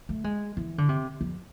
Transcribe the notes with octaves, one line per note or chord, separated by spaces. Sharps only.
A3
G#3
E3
D3
C3
F2